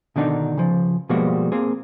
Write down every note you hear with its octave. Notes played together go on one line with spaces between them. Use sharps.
B2 D3 D#3 D4 D#4
C#3 F3
B2 F3 G3 G#3 A#3 F#4
A#3 C4 G#4